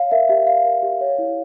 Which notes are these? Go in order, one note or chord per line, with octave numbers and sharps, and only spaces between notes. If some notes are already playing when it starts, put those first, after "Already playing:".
Already playing: C#5 F5
A#4 E5
G4 E5
A#4 F5
A#4
G4
C#5
E4